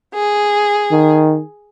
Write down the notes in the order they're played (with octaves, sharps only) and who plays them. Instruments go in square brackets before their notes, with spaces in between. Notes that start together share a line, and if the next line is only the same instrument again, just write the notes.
[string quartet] G#4
[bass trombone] D#3